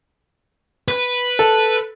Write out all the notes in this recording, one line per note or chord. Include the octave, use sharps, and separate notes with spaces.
B4
A4